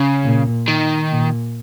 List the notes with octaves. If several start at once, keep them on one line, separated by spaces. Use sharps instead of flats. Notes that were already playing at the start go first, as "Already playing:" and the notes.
Already playing: C#3
A#2
D#3
A#2